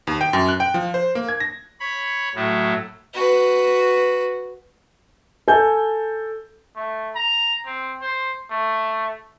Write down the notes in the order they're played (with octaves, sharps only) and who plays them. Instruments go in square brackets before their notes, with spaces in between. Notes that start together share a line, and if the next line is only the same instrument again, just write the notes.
[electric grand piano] D#2
G5
F#2
F#6
G5
F3
C5
A#3
G#6
A#6
[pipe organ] C#5 B5
A2 F#3 A3
[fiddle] F#4 B4
[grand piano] A4 G#5 G6
[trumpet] A3
A#5
C4
C5
A3